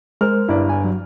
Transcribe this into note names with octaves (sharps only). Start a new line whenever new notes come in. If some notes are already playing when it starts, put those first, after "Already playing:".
G#3 A#4 C5 F6
G1 G2 E4 D5
G#5
F#3